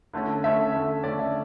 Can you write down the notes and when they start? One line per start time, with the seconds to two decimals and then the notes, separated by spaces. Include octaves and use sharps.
0.13 D3 A3 C#4
0.44 D3 A3 C#4 E5
0.73 D3 A3 C#4
1.04 D3 A3 C#4 D5
1.19 E5